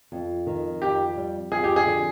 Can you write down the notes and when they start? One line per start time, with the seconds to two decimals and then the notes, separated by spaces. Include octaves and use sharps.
0.12 F2
0.47 D#3
0.81 F2 G4
1.16 G3
1.52 F2 G#4
1.64 G4
1.76 G#4
1.86 D3